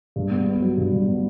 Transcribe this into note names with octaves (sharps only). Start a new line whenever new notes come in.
G2
B3
B3
F#3
G2
G2
B3